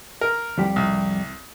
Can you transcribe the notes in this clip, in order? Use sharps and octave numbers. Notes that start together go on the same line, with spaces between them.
A#4
F2 G3 G4
C2